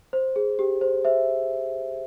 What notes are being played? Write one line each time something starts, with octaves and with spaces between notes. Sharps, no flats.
C5
G#4
G4
C5
C5 E5